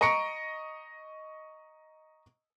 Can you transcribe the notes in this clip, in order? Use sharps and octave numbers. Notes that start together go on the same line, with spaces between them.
D#5 A#5 C#6 C#7 D7